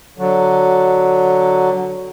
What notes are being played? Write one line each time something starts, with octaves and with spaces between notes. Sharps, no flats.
D3 F#3